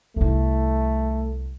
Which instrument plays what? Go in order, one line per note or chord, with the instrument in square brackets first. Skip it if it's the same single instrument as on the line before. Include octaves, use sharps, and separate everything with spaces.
[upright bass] C2 E4 [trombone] A3